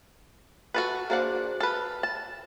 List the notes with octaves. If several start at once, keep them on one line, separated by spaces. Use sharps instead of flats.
F#4 A4 B4
A#3 D4 F#4 G#4 C5 F#5
A4 B4 F6
A5